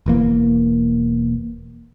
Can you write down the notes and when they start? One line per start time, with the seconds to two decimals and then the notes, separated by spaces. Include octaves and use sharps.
0.06 E1 E3 A#3